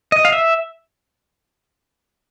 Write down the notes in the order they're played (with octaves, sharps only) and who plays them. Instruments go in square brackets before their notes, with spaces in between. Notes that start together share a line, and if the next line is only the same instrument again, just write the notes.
[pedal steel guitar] D#5
F5
E5